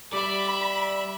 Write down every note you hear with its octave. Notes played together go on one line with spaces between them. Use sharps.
G3 D5 E5 B5